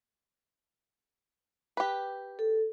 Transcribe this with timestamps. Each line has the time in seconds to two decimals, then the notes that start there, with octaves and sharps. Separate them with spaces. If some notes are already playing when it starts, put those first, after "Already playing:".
1.77 G4 B4
2.39 A4